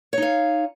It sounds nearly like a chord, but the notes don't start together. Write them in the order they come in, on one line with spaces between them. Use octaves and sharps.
C#5 D#4 F5